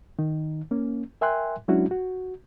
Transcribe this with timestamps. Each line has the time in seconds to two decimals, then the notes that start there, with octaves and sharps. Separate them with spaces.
0.19 D#3 D#4
0.71 A#3 C#4
1.21 A#4 E5 G5 G#5 C6 F#6
1.68 F#3 G#3 C#4 D4 E4 F#4
1.91 F#4